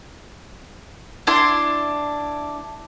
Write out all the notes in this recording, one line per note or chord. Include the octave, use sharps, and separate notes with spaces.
D4 E4 C6